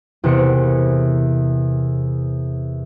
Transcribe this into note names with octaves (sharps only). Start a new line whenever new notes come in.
E2 C3 A#4 C#7 D7